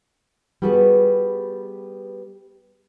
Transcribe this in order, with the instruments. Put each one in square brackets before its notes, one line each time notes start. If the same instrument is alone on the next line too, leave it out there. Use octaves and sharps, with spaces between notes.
[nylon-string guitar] G3 B3 F#4 G#4 A4 B4